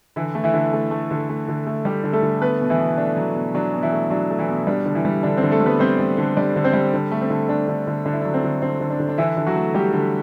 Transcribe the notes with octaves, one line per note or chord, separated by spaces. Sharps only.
D3 E3 E4
A3
E3 E4
D3
A3
A3
D3
A3
D3
A3
G3 A3 G4
D3
A3 A4
D3
A3 B3 B4
B2
E3 E4
B2
A3 D4
F#3
B2
F#3 D4
B2
E3 E4
A3
F#3 D4
A3
E3 E4
B2
G3 D4
D3
E3 E4
G3
D3 D4
C4
D3
A3 A4
G3
B3 B4
G3 C4 C5
G3
D3
G3 D4 D5
D3
C4 C5
G3
D3
A3
C4
D3
A3 D4
D3
D3
D3 D4
E4
D4
F#3
C4
D3
D3 C4
D3
D4
D3
D4
D3 E3 E4
D3
F#3 F#4
A3
G3 A3 G4
D3